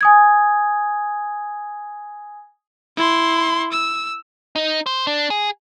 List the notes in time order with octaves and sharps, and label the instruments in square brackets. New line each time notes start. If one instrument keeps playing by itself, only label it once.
[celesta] G#5 D#6 G#6
[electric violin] E4 C6
E6
[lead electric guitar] D#4
C5
D4
G#4